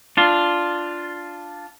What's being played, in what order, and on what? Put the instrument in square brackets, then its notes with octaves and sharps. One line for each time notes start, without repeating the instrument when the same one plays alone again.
[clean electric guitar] D4 F4